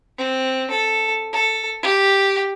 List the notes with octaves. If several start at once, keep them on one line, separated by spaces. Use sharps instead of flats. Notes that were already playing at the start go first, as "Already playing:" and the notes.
C4
A4
A4
G4